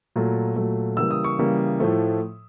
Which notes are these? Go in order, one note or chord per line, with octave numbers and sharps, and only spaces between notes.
A#2 F#3 A3
A#2 F#3 A3
C#3 E3 G3 A#3 E6
D#6
C#6
C#3 E3 G3 A#3
A2 F3 A3